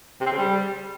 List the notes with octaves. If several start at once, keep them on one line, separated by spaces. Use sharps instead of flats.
C3
C4
C#3
G3